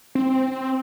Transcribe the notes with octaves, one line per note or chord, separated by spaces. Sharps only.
C4